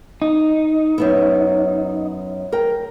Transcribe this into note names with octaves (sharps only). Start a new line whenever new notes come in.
D#4
F#2 B3 E4
A#4 G5